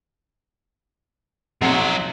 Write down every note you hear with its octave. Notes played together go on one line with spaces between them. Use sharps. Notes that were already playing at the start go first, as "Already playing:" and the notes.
B1 C3 F3 C#5